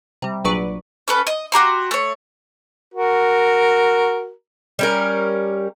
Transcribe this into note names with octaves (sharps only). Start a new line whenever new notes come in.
C3 G3
A#1 F#3 B4 D5 C#6
C#4 A4 B4
D#5
F#4 G4 A#5 C6
A3 C#5
F#4 A#4
G3 C#4 A#4